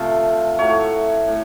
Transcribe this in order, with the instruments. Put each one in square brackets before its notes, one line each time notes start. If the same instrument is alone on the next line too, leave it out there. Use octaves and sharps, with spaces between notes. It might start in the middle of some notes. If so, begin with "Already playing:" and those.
Already playing: [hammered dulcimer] C3 F3 A3 F4
A2 F#3 A3 C#5
A2